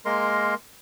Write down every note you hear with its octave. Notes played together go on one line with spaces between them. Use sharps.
G#3 A#3 A#4 C6